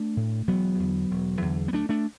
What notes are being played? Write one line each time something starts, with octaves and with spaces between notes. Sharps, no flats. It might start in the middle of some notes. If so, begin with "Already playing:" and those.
Already playing: A3 D4
A2
E1 F#3 B3
E2 D3
E1
E2 D3
B3
D2 A3 D4
A3 D4